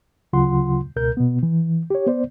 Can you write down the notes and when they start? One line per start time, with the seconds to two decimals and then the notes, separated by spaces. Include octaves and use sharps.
0.33 D2 C#3 F#3 F4 F#5 C6
0.96 C#2 B2 A#4 G6
1.17 B2 B3
1.43 E3
1.90 G4 C#5
2.07 B3 C5 D5